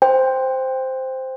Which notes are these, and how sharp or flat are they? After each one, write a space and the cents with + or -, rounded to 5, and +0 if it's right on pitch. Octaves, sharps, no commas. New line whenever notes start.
C5 -5 G5 +15